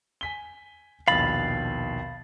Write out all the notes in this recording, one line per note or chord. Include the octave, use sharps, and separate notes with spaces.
G#5 B6 G7
A#1 D#2 B2 F5 B5 A6